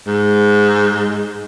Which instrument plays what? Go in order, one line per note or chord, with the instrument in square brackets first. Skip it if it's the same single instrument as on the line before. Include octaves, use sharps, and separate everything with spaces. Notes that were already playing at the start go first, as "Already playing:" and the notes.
[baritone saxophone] G#2